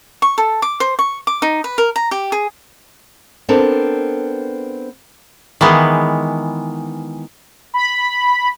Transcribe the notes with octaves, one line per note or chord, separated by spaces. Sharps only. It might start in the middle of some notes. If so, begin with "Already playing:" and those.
C#6
A4
D6
C5
C#6
D6
D#4
B4
A#4
A#5
G4
G#4
B3 C4 D4 A4 A#4
D#3 E3 G#3 B3
B5